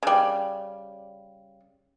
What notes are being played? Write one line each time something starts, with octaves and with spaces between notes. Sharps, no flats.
C#3 G3